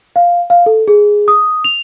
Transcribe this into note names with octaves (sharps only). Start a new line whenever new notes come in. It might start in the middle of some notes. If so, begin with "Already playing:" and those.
F5
F5
A4
G#4
D#6
F7